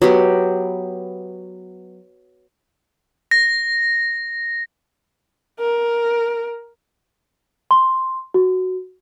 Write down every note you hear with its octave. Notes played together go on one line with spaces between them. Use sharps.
F#3 B3 G4
A#6
A#4
C6
F#4